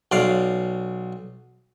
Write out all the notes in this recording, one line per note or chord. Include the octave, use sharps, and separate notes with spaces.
B1 D5 F5